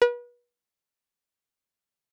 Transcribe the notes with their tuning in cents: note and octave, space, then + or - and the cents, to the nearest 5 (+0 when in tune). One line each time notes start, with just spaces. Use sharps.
B4 -35